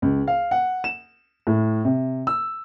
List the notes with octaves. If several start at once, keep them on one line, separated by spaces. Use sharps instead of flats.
C#2
F5
F#5
E7
A2
C3
E6